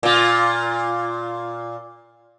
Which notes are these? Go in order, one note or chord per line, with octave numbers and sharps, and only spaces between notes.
A#2 F4